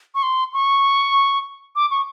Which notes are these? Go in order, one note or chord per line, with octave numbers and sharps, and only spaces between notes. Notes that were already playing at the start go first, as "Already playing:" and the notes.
C#6
C6
C#6
D6
C#6